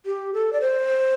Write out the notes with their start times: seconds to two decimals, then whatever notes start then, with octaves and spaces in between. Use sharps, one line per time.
0.06 G4
0.34 A4
0.53 D5
0.61 C5